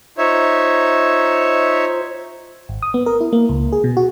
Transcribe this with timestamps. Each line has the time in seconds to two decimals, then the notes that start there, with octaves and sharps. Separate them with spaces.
0.18 D#4 F4 C5 C#5 E5
2.69 G#1
2.82 D#6
2.94 B3
3.06 A#4
3.21 E4
3.33 A#3
3.49 C#2
3.73 G#4
3.84 B2
3.97 F#4